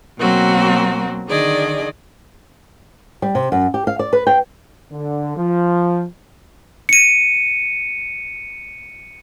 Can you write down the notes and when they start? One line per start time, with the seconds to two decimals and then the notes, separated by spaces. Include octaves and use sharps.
0.18 B2 F#3 A#3 C4 F#4 A#4
1.27 D3 D#3 G#4 D5 D#5
3.22 G3
3.35 C3
3.52 F#2
3.74 G4
3.87 F5
3.99 D5
4.13 B4
4.27 G5
4.92 D3
5.37 F3
6.89 C#7 D#7